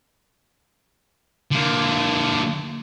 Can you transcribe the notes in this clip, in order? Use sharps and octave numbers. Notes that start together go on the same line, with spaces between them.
D3 A#3